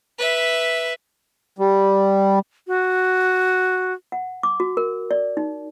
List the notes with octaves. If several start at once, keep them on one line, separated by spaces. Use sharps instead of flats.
B4 E5
G3
F#4
F#5
D6
F#4
A#4
D5
D#4